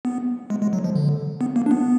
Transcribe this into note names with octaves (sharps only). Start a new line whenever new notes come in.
B3
G#3
G#3
F#3
F3
D3
B3
A#3
D4
B3